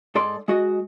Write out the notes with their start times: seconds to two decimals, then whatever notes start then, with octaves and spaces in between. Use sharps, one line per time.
0.15 G#2 A4 D5 C6
0.48 G#3 F#4 D#5